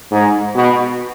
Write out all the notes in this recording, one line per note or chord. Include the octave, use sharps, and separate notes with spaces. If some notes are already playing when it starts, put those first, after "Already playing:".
G#2
B2